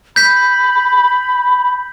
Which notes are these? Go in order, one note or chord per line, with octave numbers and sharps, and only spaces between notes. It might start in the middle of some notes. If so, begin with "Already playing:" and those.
B5 G6 B6